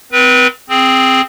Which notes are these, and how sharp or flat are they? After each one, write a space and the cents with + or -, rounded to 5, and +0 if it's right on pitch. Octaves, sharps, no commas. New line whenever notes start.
C4 -30 B4 -25
C4 +0 G#4 +0